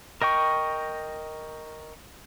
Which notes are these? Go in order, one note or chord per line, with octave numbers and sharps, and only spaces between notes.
A#4 D#5 G5 C#6